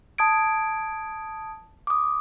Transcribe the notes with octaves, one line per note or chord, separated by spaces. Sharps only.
A5 D#6 G#6 D7
D6 D#6